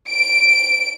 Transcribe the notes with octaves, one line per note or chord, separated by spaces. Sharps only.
D7